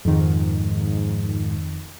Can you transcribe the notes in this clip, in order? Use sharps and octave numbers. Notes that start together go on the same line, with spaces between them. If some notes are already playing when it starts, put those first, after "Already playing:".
F2 G#2 D#3